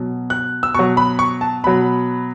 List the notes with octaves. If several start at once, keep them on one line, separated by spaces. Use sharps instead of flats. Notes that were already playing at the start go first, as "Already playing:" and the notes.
Already playing: B2 F#3
F#6
E6
B2 F#3 C#6
B5
C#6
A5
B2 F#3 B5